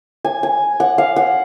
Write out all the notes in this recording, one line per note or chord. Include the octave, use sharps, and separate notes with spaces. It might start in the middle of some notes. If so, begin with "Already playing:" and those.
G#5
G#5
F#5
F5
F#5